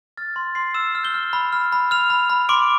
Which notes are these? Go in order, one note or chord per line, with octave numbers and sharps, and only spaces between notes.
F6 A6
C6
C6 C7
E6 F6 E7
F6
G6 G7
F6
B5
F6
B5
F6 F7
B5
B5
C6 D6 D7